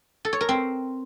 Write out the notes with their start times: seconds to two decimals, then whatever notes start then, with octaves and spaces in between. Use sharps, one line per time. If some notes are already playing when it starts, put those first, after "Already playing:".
0.25 A4
0.33 C#5
0.41 A#4
0.49 C4